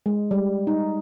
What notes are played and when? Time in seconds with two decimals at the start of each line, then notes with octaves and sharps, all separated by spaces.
0.06 G#3
0.31 G3
0.67 D#4